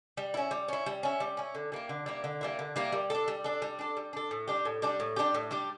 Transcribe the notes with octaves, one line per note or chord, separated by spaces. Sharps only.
G3
C#4 E4
G3
C#4 E4
G3
C#4 E4
G3
C#4 E4
D3
G3 A#3 E4
D3
G3 A#3 E4
D3
G3 A#3 E4
D3
G3 A#3 E4
G3
D4 A4
G3
D4 A4
G3
D4 A4
G3
D4 A4
A2
G3 D4 G4
A2
G3 D4 G4
A2
G3 D4 G4
A2
G3 D4 G4